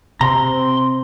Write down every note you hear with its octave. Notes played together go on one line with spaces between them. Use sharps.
C3 C4 A#5 C6